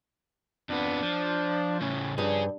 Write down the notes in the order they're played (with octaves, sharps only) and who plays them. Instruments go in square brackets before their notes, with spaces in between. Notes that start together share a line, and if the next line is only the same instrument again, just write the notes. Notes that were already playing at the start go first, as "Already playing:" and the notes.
[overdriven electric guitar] F2 B3 [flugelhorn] D4
[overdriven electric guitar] F3
[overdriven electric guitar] A2 C#3 [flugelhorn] C#4
[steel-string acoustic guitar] G2 [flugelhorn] F3 [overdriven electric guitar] C#4 G#4